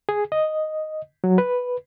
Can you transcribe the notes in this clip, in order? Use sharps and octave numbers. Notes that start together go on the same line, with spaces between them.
G#4
D#5
F#3
B4